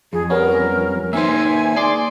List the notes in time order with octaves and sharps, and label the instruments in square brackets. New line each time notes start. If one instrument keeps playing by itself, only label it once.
[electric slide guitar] F2 [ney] G#4
[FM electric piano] G3 B3 C#4 [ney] A#4
[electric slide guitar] A#3 D#4 B4 [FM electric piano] C5 E5 [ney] G#5
[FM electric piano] G#4 C6 D6 [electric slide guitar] D5